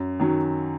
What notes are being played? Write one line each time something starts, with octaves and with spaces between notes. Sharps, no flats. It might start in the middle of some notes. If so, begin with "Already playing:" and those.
Already playing: F#2
D#3 F#3